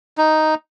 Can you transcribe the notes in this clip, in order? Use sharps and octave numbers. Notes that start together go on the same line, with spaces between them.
D#4